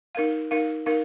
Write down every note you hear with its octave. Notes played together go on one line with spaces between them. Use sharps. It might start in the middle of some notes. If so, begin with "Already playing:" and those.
D#4 A#4 F5
D#4 A#4 F5
D#4 A#4 F5